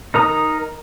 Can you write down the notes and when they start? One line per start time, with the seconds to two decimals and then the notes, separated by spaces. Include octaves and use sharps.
0.14 D#4 A#4 A#5 D#6